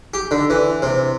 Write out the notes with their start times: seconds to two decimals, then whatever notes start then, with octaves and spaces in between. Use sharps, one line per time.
0.14 G4
0.31 D3
0.50 E3
0.82 C3